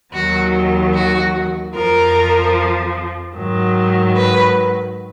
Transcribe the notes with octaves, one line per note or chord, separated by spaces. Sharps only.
D#2 D#3 F#3 F#4
F#4
F2 F3 A#4
G#2 D#3 F#3
B4